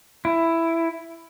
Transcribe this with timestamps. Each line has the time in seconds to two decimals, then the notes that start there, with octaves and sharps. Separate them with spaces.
0.25 E4